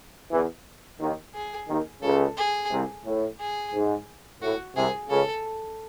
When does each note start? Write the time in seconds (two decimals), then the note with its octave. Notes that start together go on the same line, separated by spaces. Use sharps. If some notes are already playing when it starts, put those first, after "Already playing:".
0.32 E2 E3
1.00 D#2 D#3
1.35 G#4
1.69 D#2 D#3
2.02 C#2 C#3 A4
2.37 G#4
2.71 C2 C3
3.05 A2
3.40 G#4
3.74 G#2
4.42 A2 F#4
4.76 C2 C3 G#4
5.10 C#2 C#3 A4